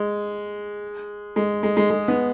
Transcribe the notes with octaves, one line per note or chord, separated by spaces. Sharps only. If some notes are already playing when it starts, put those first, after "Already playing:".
Already playing: G#3
G#3
G#3
G#3
G#3
B3